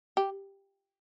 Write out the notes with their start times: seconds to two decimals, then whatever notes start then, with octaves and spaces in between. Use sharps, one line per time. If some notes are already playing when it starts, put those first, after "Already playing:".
0.17 G4